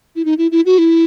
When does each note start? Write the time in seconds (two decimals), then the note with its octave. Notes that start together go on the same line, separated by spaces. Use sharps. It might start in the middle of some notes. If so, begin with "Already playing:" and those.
0.16 E4
0.25 D#4
0.38 E4
0.52 E4
0.66 F#4
0.78 E4